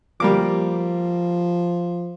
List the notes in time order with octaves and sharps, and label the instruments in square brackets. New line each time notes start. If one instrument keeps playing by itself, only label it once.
[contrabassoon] F3 [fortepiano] G3 A#3 D6